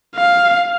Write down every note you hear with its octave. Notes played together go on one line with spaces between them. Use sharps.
F5